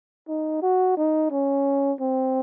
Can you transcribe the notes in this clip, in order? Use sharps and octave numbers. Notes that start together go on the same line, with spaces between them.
D#4
F#4
D#4
C#4
C4